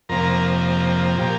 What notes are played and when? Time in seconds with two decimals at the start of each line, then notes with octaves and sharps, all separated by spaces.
0.09 F2 C3 F3 A#3 A#4
1.18 A#2 F3 A#3 G4